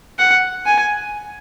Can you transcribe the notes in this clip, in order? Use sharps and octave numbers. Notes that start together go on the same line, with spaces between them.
F#5
G#5